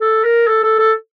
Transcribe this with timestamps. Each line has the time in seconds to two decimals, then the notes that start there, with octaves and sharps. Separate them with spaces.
0.01 A4
0.24 A#4
0.47 A4
0.63 A4
0.78 A4